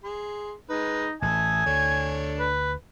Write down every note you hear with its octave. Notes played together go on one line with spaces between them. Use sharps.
G#4 C6
G#3 D#4 B4
A1 E5 G#5 A5 D#6
D2 D4 A4 C#5
B4